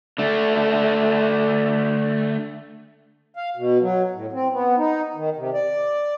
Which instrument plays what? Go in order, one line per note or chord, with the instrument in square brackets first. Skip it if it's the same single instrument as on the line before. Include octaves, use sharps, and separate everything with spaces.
[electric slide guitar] D3 A3
[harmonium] F5
B2
F#3
A2
C4
B3
D#4
D#3
C3
D5